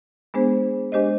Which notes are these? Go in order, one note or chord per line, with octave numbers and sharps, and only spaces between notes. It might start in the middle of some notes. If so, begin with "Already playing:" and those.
G#3 B3 D4 G#4 C5
G#3 D4 G4 C5 D#5